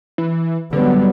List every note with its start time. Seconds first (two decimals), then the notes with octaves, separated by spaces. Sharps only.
0.18 E3
0.73 D3 F#3 G3 B3